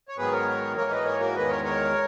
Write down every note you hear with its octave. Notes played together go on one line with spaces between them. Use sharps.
C#5
G#2 D#3 F#3 B3 G#4 B4
A#4 C#5
G#2 E3 A#3 A#4 C#5
B4 D#5
A#4 C#5
F#4 A#4
E2 D#3 G#3 B4 D#5
A#4 C#5
A#4 C#5